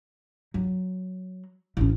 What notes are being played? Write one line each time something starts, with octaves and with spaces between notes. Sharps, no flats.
F#3
A1 C#4